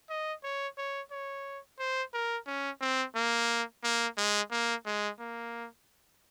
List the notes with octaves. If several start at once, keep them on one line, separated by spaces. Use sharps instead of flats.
D#5
C#5
C#5
C#5
C5
A#4
C#4
C4
A#3
A#3
G#3
A#3
G#3
A#3